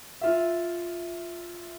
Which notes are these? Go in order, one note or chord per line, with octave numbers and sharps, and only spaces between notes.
F4 E5